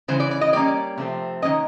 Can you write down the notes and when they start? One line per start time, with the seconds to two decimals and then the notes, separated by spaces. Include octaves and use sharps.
0.08 C#3 E3 G#3 C#4 C5
0.20 D5
0.31 D5
0.41 D#5
0.53 B2 G3 A#3 C#4 D5
0.98 C3 F3 A3 C4
1.42 D#3 F#3 A#3 C#4 D#5